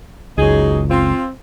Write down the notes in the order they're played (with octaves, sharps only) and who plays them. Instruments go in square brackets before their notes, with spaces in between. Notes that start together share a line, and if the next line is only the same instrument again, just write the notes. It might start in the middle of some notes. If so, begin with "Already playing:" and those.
[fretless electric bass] F#1 C#2 [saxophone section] F#3 D#4 G#4
[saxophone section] C4 F4